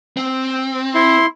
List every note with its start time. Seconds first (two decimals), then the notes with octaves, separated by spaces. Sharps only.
0.17 C4
0.95 E4 C6